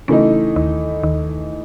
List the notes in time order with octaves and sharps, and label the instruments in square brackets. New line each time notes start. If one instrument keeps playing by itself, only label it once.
[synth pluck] C#3 C#4 [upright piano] E3 A3 D#4
[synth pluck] D#2 D#3
D#2 D#3